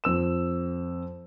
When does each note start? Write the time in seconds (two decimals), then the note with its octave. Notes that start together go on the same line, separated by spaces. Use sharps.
0.04 F2 E6 E7